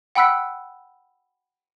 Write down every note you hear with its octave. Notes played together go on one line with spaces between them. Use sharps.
F#5 G5 B5 E6 F#6 B6